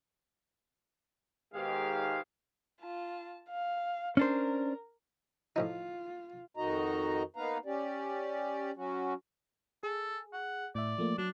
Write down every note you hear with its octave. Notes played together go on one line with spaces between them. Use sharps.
G#2 B2 D#3 G#3 G4 F5
F4 A5
F5
C#4 D4 A#4 C5
A2 F3 D#4 F4
F2 D#3 D#4 F#4 D#5 A#5
A#3 B3 D#4 B4 F5 A#5
C#4 G4 D5
F#3 C#4 F#4
G#4 A4
F#5
A2 D5 E5
F3 A3 A#3
F#3 D4